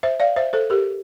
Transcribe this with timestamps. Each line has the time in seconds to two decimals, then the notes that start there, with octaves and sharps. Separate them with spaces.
0.03 C5 E5
0.20 D5 F5
0.36 C5 E5
0.53 A4 C5
0.70 G4 A#4